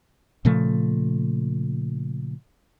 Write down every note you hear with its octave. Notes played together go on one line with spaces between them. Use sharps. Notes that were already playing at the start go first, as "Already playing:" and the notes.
A#2 C#3 F3 A3